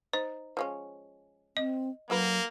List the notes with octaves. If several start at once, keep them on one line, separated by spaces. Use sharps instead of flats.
D#4 C5
F3 G#3 C#4
C4 D#5
D3 F#3 A#3 F#4 B4